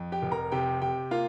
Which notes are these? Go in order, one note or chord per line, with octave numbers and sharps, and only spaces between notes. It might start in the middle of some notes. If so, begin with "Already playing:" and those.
Already playing: F2
G4 G5
F1
A#4 A#5
C3 G4 G5
C3 G4 G5
A#3 F4 F5